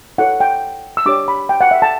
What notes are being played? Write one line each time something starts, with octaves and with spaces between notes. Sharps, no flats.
E4 A4 C#5 F#5
G5
E6
D4 G4 C#5 D6
B5
G5
F#5
E5
A5